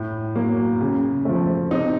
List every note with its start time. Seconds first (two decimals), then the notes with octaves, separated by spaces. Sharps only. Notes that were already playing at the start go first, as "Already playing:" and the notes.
Already playing: A2
0.35 F#3 A#3
0.81 C#3
1.25 F3 A3
1.71 C3 D#4